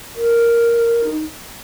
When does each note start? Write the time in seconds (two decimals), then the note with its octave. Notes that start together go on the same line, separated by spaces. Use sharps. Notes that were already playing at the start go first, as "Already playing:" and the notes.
0.16 A#4
1.04 D#4